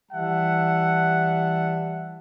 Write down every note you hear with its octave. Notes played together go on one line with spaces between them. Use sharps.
E3 G3 E5 F#5 A5